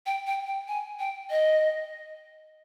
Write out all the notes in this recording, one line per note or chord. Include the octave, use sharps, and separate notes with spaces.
G5
G5
G5
G#5
G5
D#5